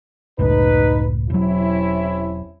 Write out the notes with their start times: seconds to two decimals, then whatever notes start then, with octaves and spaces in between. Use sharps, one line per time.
0.39 F#1 C#2 A2 D#4 B4
1.30 E1 C3 F#3 C#4 E4